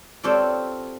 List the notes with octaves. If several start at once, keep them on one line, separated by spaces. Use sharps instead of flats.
C4 F4 G4 A4 C#5 D5